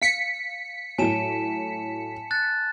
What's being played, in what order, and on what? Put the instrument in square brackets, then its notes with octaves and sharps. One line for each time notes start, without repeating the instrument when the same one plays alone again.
[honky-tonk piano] F5 [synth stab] B6 C#7
[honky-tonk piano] A2 F#3 [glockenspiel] G#5 A5 E7
[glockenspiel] F#6 A6